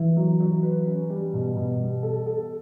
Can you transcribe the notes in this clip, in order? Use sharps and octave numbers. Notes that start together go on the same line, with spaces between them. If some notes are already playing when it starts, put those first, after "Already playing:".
Already playing: E3 E4
F#3
F#3
B4
C#4
G3
B2
B2
G3
A4
A4